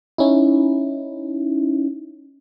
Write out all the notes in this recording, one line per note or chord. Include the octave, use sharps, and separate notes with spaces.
C#4 D#4 E4